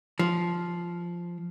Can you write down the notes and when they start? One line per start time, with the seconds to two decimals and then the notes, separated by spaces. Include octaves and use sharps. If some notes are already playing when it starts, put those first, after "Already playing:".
0.19 F3